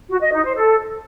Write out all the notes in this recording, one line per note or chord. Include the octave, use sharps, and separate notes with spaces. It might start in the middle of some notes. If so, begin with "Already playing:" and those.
F#4
D#5
D#4
C5
A4